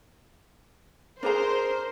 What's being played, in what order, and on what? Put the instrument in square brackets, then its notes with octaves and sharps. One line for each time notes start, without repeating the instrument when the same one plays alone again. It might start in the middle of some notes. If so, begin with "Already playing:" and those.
[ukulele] D4 G#4 A#5 [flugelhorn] A#4 [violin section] C5